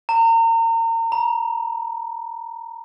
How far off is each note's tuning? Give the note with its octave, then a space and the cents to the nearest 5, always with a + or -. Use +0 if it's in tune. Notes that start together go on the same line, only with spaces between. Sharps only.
A#5 -35
A#5 +40